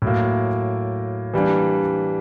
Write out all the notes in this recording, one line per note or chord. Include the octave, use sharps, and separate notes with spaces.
A2 F#3 A#3
E3 G3 A#3 D4